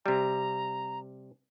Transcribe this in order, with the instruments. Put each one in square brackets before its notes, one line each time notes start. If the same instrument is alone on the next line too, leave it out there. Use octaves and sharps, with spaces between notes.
[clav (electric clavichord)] C3 G3 [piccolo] A#5